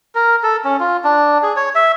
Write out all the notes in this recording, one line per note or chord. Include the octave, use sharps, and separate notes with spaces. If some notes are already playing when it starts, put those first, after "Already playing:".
A#4
A4
C#4
F4
D4
G#4
C#5
E5